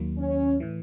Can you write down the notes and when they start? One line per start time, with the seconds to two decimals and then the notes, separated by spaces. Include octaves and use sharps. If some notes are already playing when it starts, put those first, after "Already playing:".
Already playing: D#2 D#3 F#3 A#3
0.18 C#4
0.60 A2 E3